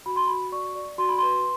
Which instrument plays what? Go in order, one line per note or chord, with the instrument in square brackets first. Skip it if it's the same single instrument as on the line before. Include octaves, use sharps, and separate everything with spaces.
[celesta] F#4 B5
C6
F#4 B5
D5 C#6
D5
F#4 C6
B5
B4 C6